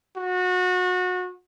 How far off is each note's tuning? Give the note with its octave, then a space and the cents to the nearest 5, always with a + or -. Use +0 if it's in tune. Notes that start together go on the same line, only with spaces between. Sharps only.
F#4 -25